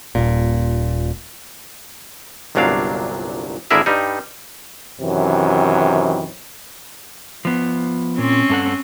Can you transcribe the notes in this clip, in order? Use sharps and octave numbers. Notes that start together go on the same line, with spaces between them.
D#1 A#2
G1 C2 A#2 F#3 D4 F5
G#1 D3 E4 G#4 A#4 E5
G2 G3 D#4
F#2 C3 D#3 E3
F3 B3
A#2 C4 C#4
G2 A4 F#5